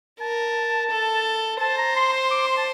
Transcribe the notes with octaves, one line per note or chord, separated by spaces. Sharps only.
A#4 A5
A4
C5 A5
A#5
C6
C6
D6
C6
A5